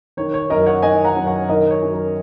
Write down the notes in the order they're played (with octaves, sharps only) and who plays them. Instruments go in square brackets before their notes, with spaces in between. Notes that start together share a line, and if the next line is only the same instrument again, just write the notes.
[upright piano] D#3 C#5
C#5
F#2 A#4 D#5
C#5 F#5
D#3 D#5 G#5
F#5 A#5
F#2
C#5 F#5
D#3 A#4 D#5
C#5
F#2
A#4